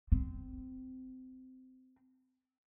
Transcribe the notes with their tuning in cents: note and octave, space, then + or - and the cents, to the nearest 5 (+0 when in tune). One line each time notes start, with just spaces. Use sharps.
C4 -20